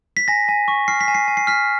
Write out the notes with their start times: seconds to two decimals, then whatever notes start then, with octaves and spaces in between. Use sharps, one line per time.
0.17 B6
0.28 G#5 A#6
0.48 G#5
0.68 C#6
0.88 F6 C7
1.01 B6
1.08 G#5
1.15 C7
1.28 G#5
1.37 C7
1.47 F6 B6